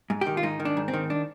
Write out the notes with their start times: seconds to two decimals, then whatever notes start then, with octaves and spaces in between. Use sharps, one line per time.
0.10 G#2
0.21 D#3 G4
0.37 F4
0.43 G#2 D#4
0.60 D#3
0.65 D4
0.77 G#2
0.88 C4
0.94 D#3
1.10 D4